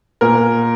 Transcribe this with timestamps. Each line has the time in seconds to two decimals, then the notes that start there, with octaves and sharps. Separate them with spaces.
0.21 A#2 A#4